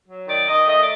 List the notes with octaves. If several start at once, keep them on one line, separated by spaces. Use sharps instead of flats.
F#3
D#3 D5
D#3 D#5
A3 D#5
D5